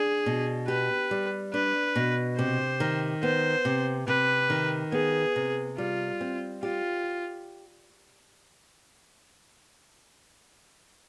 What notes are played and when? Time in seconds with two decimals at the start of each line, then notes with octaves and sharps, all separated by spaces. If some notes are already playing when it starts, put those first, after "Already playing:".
Already playing: D4 G#4
0.26 B2
0.68 G4 B4
1.11 G3
1.53 D4 B4
1.96 B2
2.38 C3 C5
2.80 D#3
3.23 B3 C5
3.65 C3
4.08 C3 B4
4.50 D#3
4.92 B3 G#4
5.36 C3
5.77 G3 F4
6.21 C4
6.63 F4 G4